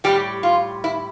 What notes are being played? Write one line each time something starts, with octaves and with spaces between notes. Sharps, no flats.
A2 G3 G4
F4
E4